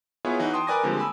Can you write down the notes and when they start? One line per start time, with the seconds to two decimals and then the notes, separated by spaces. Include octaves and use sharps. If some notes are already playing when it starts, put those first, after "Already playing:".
0.25 B3 E4 F4 G#4 C#5
0.39 E3 D#4 F#4
0.53 G5 A5 C6 D#6
0.67 A#4 B4 D5 G#5 D6 A#6
0.83 D3 F3 G3 G#3 A#3 C4
0.97 G#5 A5 B5 E6